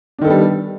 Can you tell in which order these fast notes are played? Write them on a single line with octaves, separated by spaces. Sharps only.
D4 D#3 A4 B3 G3